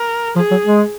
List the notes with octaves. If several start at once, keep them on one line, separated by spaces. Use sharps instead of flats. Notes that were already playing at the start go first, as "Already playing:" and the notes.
Already playing: A#4
F3 G#4
F#3
G#3